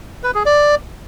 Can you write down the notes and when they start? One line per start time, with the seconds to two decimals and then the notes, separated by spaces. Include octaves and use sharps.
0.24 B4
0.35 G#4
0.46 D5